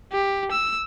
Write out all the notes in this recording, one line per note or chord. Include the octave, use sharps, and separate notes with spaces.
G4
E6